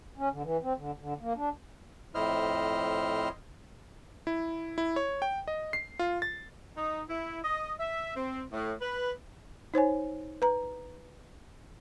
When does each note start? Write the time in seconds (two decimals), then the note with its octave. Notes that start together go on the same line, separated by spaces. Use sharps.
0.17 C#4
0.31 D3
0.43 E3
0.63 C4
0.76 D3
0.98 D3
1.21 A#3
1.35 D4
2.15 F2 A2 E4 C5 D#5 F6
4.27 E4
4.78 E4
4.96 C#5
5.22 G5
5.48 D#5
5.73 C7
5.99 F4
6.22 A6
6.77 D#4
7.09 E4
7.44 D#5
7.80 E5
8.16 C4
8.53 A2
8.81 B4
9.74 D#4 C5 C#5 G#5
10.42 B4 A#5